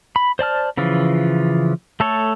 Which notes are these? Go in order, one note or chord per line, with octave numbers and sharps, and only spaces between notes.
B5
C5 D5 A5 F6
C#3 E3 F3 F4
A3 A4 C#5